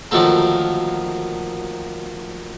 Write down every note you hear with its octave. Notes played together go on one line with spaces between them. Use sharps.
D2 D#3 F3 F#3 A#3 A4